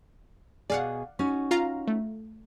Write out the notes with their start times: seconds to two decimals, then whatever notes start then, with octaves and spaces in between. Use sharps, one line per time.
0.70 B2 G#4 D5 F5 F#5
1.19 C#4 D#4 F#4
1.51 F4 F5 A#5
1.88 A3